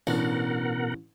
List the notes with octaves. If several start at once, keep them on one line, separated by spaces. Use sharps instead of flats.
A1 B2 D4 A#4 F#5